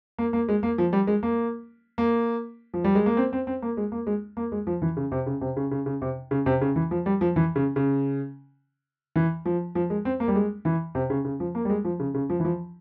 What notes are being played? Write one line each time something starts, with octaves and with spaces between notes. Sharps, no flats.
A#3
A#3
G#3
A#3
F3
G3
G#3
A#3
A#3
F3
G3
G#3
A#3
C4
C4
C4
A#3
G#3
A#3
G#3
A#3
G#3
F3
E3
C#3
C3
C#3
C3
C#3
C#3
C#3
C3
C#3
C3
C#3
E3
F3
G3
F3
E3
C#3
C#3
E3
F3
F3
G#3
C4
A#3
G3
G#3
E3
C3
C#3
C#3
F3
A#3
G3
G#3
F3
C#3
C#3
F3
E3
F3